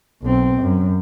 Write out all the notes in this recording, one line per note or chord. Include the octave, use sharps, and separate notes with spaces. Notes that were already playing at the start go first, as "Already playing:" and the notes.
B1 C4
F#2